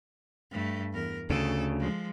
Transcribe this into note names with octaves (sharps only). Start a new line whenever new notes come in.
G2 A3
E2 A#4
D2 C#3 A4
F3 G#3